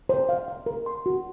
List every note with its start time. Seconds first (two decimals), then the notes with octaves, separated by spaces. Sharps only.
0.09 C5
0.29 F5
0.48 F5
0.66 A#4
0.86 C6
1.06 F#4